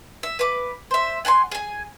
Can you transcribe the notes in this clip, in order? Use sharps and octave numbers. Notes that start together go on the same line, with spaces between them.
E5
B4 D6
C5 E5
F#5 G#5 A5 C6
G#4 G#5